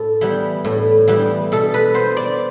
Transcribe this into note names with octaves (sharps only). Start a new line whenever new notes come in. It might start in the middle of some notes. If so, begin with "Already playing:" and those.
Already playing: A2 A4
E3 G3 B3
A2
E3 G3 B3
B2 A4
B4
B3 C5
D5